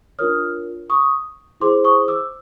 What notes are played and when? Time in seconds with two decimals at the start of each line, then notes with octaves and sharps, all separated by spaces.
0.19 D4 F4 A#4 C#5 D#6 F6
0.90 C#6 D#6
1.60 E4 G#4 C5 C6 D6
1.85 C#6 D#6
2.08 D6 E6